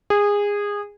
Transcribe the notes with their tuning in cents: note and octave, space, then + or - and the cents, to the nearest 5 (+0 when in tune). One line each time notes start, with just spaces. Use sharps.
G#4 -20